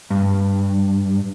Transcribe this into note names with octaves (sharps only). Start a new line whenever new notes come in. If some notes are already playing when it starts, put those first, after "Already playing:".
G2